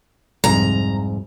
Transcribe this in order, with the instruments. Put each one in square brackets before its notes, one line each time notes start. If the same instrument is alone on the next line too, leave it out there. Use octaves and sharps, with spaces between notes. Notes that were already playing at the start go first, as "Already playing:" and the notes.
[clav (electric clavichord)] C2 F2 G#2 [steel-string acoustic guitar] A#5